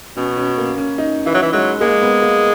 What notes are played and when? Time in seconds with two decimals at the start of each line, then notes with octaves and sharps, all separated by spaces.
0.17 B2 C#4
0.37 C#4
0.58 A#3
0.78 C#4
0.98 D#4
1.26 E3 E4
1.35 F#3
1.42 E3
1.53 F#3 G#3
1.81 G#3 A#3
2.02 B3
2.22 A#3